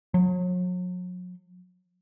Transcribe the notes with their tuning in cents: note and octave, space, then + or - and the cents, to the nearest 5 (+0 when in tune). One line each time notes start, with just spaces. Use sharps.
F#3 -40